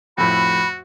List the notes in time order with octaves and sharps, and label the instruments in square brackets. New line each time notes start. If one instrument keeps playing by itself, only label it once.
[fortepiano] F2 A2 [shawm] F#4 [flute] B5